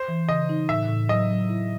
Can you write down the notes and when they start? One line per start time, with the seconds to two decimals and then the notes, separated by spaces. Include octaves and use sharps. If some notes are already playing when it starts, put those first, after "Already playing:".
Already playing: C5
0.08 E3
0.28 C#3 D#5
0.49 D#4
0.69 A2 E5
0.89 A2
1.09 F#3 D#5
1.30 F#3
1.50 E4